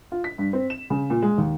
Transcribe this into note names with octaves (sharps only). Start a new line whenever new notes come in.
F4
B6
G2
C4
E7
C#3
A#2
G#3
D#2